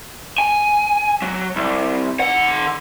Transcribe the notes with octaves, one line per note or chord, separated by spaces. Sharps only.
G#5
F#3
C2
D#3 F#5